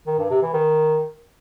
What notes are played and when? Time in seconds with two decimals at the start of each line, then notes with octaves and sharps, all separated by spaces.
0.07 D#3
0.19 G2
0.30 C3
0.42 E3
0.54 D#3